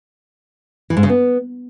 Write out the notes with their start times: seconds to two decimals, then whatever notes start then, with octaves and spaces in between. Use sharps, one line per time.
0.90 E3
0.97 G#2
1.03 C#3
1.09 B3